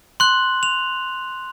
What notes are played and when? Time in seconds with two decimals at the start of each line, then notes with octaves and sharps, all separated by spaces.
0.20 C6 F#6 F#7
0.63 F7